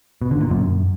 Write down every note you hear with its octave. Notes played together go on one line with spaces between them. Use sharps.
B2
D3
A#2
F#2